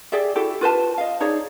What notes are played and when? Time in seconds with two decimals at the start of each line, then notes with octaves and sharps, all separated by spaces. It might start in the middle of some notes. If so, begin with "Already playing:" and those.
0.12 G4 G#4 D5 E5
0.36 E4 F#4 G4 A4
0.61 F4 B4 C5 A5
0.98 D#5 F5
1.20 D#4 G#4 C#5 D5